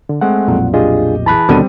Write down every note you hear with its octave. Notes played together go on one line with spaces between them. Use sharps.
D3
G#3 A3 C4 F#5
B1 F2 A#2
D4 F4 G4 G#4 D#5
E3 G#4 A5 B5 F#6
D#2 B2 D3 G3 C4 D#7